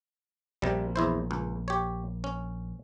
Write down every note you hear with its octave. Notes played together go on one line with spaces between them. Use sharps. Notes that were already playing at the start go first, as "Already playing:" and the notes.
A#1 C3 G3
E2 E4 C5
C#2
G4 C#5
C#4